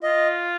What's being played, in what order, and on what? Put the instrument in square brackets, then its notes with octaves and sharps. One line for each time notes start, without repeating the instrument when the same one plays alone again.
[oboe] F4 [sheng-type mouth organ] D#5